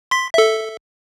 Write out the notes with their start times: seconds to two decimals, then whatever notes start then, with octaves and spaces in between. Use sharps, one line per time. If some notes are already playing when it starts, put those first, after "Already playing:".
0.11 C6 B6
0.34 A4 E5